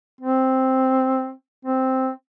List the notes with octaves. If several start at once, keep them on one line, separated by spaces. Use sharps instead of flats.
C4
C4